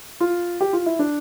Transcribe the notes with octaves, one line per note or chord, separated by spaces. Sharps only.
F4
G4
F4
E4
D4